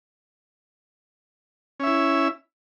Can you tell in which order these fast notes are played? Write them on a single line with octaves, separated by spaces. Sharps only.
C#4 E5 E4